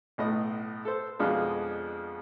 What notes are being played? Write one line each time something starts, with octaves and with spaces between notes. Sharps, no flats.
B1 A2 D#5
A4 C5
F2 B2 F3 G#3 D4